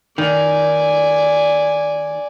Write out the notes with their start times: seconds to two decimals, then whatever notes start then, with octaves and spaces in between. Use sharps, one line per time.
0.18 D#3 D5 G#5